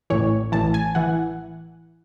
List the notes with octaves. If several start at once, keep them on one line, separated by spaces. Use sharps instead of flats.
A1 A2 E3 C#5
A1 A2 E3 A5
G#5
E3 F#5